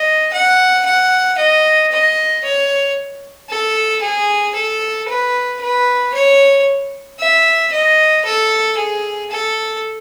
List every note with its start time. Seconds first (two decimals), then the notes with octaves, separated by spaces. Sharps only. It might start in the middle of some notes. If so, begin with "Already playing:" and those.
Already playing: D#5
0.33 F#5
0.86 F#5
1.38 D#5
1.92 D#5
2.44 C#5
3.49 A4
4.02 G#4
4.55 A4
5.08 B4
5.61 B4
6.14 C#5
7.19 E5
7.72 D#5
8.25 A4
8.77 G#4
9.30 A4